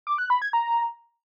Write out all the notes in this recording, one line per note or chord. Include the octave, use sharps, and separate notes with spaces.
D6
F#6
B5
G#6
A#5